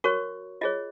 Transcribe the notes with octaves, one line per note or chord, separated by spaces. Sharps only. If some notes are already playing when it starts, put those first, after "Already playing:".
F#4 A#4 C#5 C#6
F4 G#4 C#5 D#5